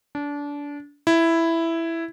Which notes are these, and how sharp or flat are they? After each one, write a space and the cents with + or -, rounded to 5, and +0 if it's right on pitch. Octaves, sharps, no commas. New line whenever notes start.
D4 -25
E4 +5